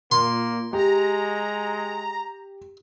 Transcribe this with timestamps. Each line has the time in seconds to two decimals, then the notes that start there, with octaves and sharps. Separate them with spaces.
0.11 A#2 A#3 C6
0.73 G#3 G4 A#5